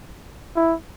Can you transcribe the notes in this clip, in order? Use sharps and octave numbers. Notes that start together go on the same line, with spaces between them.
E4